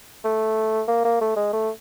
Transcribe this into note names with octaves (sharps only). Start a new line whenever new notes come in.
A3
A#3
A#3
A3
G#3
A3